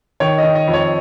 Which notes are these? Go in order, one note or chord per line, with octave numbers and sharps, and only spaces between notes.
D#3 C#5
D#5
D#3
D#5
F2
C#5